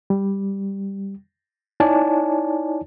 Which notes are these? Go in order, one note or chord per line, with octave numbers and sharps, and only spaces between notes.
G3
D#4 E4 C#5 D5 G#5 A5